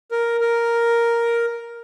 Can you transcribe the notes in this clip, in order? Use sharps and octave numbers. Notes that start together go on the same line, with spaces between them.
A#4
A#4